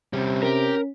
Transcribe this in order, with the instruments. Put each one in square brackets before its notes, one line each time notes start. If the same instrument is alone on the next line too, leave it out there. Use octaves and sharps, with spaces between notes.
[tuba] C3 [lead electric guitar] G3 C#4
[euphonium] C#4 [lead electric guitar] G4 [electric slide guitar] A#4